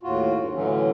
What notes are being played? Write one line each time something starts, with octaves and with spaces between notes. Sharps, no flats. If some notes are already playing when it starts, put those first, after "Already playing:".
D#2 A2 F4 F#4
G2
A2 D3 E3 F#3 C#4